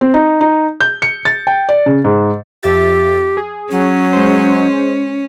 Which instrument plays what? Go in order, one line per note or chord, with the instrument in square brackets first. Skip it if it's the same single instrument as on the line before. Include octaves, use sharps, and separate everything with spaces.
[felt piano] C4
D#4
D#4
G6
C#7
A6
G5
D5
C#3
G#2
[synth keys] F2 E5 A6 [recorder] G4
[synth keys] G#4
[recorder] F#3 [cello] C#4
[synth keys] G#3 C5